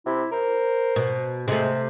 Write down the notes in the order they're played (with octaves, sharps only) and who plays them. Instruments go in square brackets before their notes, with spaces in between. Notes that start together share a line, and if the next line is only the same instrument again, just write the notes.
[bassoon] C3 [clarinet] E4
[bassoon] A#4 [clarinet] C5
[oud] B2
[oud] C3 A3 [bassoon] G#3